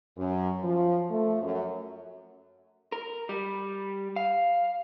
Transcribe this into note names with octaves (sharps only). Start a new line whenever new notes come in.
F#2
F3
A3
F#2
A#4
G3
F5